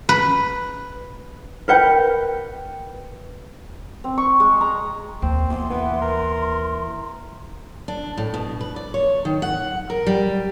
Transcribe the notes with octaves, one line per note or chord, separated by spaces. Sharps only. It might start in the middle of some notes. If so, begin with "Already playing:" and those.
B4
A#4 B4 F#5 G5
C4
C#6
G#3
A#5
D#2 C4
E2 C6
E3 B3
A#4
D4
A2
B2
B4
D5
C#5
D#3
F#5
A#4
G3